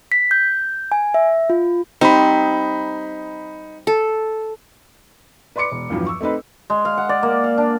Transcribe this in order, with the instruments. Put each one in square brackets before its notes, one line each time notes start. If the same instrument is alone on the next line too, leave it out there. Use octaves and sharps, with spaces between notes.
[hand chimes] B6
G6
G#5
E5
F4
[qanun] G3 C4 [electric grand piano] D#4 B5
[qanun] A4
[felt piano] B4 D5 C6 D6 C#7
E1
E2 G2 F3 F#3
C#6 E6
A3 C4 D#4 B4
[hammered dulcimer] G#3
F5
F#5
D5
A#3
F5
D4